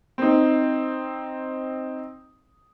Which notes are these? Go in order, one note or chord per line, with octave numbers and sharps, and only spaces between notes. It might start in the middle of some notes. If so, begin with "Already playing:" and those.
C4 D#4